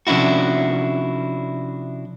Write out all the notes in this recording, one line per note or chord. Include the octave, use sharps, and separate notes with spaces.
C3 F3 C#4 D4 E4 F#4